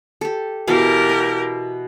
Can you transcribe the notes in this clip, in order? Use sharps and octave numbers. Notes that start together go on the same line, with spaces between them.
G4 A4
B2 E3 G4 A#4 F5
G#5